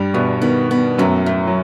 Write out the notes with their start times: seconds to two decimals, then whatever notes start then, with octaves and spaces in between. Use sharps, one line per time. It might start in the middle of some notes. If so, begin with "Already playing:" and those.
Already playing: G2 G3
0.14 E2 B2 B3
0.42 D#3 B3
0.71 B3
0.98 F#2 A2 F#3
1.26 A2
1.47 F#3